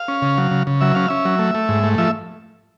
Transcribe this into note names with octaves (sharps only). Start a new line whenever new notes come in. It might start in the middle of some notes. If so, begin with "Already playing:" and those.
Already playing: F5
C#4
C#3
F#3
C#3
C#3
F#3 E5
C#4 F5
C#4 E5
F#3
A3
A3
G#2
A3
F3 E5